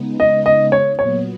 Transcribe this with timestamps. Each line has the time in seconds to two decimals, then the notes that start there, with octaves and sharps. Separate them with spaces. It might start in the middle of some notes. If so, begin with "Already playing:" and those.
Already playing: C#3 G#3 B3 D#4
0.20 D#5
0.46 D#5
0.72 C#5
0.99 A#2 F#3 B3 C#5